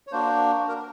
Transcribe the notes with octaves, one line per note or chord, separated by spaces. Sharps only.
C#5
A#3 D4 F#4 C5
A#4